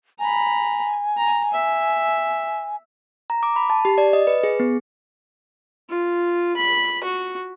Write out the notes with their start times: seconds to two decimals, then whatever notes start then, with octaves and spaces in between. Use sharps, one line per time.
0.19 G#5 A#5 B5
1.17 A#5
1.53 E5
3.30 A#5
3.43 D6
3.56 B5
3.70 A5
3.85 G4
3.98 D5
4.13 D#5
4.27 B4
4.44 G#4
4.60 B3
5.89 F4
6.56 B5
7.04 F#4